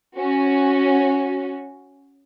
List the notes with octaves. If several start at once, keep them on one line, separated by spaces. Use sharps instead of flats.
C#4 F#4